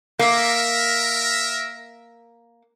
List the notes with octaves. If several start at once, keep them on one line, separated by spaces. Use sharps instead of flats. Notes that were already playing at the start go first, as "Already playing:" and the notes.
A#3 A#4 E5